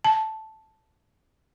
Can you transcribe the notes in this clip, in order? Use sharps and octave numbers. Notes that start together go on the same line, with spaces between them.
A5